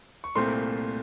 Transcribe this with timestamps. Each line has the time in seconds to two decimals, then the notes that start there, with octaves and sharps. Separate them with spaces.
0.24 C#6
0.35 C2 A#2 A3 C4 C6